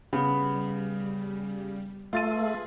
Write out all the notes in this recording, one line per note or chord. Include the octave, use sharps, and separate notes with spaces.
C#3 G3 B3
A3 F4 G#4 B4 A6 D#7